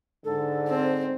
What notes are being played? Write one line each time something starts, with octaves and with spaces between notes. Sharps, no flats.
G#2 D3 A4
C4